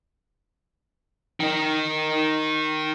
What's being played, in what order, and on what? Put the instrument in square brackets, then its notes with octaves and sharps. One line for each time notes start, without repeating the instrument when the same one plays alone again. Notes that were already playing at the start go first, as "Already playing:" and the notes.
[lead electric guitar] D#3 D#4